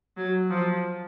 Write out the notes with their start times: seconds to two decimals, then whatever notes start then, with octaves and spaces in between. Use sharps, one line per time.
0.17 F#3
0.50 F3